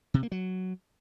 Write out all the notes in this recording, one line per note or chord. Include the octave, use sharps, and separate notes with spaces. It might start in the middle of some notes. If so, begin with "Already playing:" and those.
C3
A#3
F#3